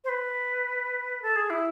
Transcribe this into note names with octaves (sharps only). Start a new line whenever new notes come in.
C5
B4
A4
G#4
E4